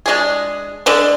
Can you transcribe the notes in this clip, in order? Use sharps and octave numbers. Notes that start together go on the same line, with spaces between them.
G#3 D4 G#4
D3 G#3 D4